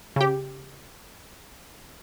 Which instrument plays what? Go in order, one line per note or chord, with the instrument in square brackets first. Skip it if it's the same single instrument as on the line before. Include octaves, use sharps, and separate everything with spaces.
[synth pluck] C#3 G4